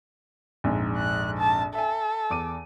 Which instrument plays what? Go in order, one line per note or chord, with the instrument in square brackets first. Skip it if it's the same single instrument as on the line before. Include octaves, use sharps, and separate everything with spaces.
[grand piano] A#1 F2 G#2
[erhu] F#6
A5
[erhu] A4 [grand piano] E5 G#5
[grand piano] E2 D6 D#7